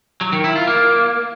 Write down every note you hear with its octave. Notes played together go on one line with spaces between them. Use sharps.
F#3
D#3
E4
F4
A#3